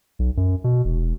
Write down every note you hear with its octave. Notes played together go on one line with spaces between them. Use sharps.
B1
F#2
B2
E1